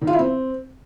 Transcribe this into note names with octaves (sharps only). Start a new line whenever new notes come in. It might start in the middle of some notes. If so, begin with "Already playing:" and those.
D#3
F4
E4
C4